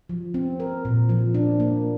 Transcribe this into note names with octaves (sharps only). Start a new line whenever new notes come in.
F3
C4
A#4
A#2
F3
D4
A#3